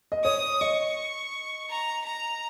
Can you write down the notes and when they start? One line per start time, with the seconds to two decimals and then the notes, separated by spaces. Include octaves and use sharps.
0.12 D#5
0.24 C#5 D#6
0.61 D#5 C#6
1.70 A#5
2.06 A#5